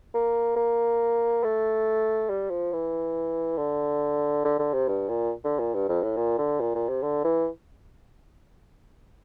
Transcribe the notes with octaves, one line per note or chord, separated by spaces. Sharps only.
A#3
A#3
A3
G3
F3
E3
D3
D3
D3
C3
G2
A#2
D3
A#2
G2
F2
A2
A#2
D3
A#2
A#2
C3
D3
E3